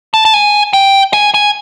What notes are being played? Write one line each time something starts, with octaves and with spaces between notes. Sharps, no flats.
A5
A5
G#5
G5
G#5
G#5